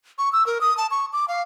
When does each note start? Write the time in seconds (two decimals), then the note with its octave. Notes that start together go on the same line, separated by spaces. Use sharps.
0.18 C#6
0.33 E6
0.46 A#4
0.61 D#6
0.77 A5
0.91 C#6
1.13 D6
1.28 F5